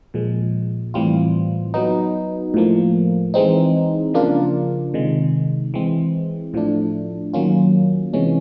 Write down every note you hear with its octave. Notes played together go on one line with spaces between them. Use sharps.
A#2 F3 G#3
A2 E3 G3 C4 F4
F#3 B3 D#4
A2 F3 A#3
E3 G#3 C4 D#4
C#3 F3 A#3 D4 F4
C3 D#3 G#3
E3 G#3 C4
A2 F3 A3 D4
D#3 F#3 A#3 C#4 F4
C3 E3 G#3 C#4